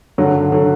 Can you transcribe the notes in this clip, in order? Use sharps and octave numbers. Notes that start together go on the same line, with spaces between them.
G2 D3 F#3
D3 F#3